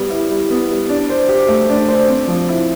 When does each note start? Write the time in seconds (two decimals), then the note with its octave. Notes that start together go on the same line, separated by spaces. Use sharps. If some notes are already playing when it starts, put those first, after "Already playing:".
Already playing: G3 B3
0.10 E4
0.29 G3
0.50 B3
0.69 G3
0.89 D4
1.10 C5
1.29 G4
1.49 A3
1.69 D4
1.88 C5
2.08 C4
2.28 F3
2.49 E4